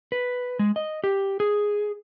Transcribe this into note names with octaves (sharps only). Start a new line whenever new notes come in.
B4
G#3
D#5
G4
G#4